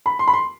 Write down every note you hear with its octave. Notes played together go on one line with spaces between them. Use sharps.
B5
C6
B5
C6